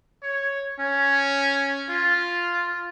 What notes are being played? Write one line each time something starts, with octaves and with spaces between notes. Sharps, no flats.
C#5
C#4
F4